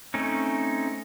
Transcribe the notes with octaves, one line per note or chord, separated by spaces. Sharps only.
A3 C4 C#4 D#4